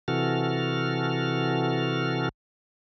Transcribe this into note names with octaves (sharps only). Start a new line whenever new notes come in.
C3 E3 F#4 A4 F6